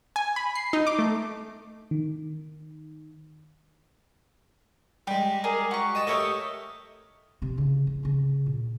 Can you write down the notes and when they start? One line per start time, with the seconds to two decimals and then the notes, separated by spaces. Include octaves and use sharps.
0.16 G#5
0.36 B5
0.55 C7
0.73 D#4
0.87 D6
0.99 A3
1.91 D#3
5.07 G3 G#3 G4
5.44 G#4 A#4 D5
5.71 F#4 G4 C#6
5.95 D#5 G5 A5
6.07 A3 G4 A4 A#4 C#5 D#5
7.42 C3 C4
7.57 C#3 E3
7.87 E3
8.03 C#3 C4
8.46 A#2